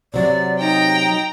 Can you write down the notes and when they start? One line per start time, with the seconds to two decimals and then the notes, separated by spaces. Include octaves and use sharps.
0.14 C3 F#3 D5
0.59 D#4 G5 A#5